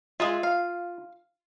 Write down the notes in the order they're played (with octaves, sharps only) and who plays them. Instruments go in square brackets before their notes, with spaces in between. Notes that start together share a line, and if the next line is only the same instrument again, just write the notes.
[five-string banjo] G#3 G#4 E5 [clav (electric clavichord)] F4
[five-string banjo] F5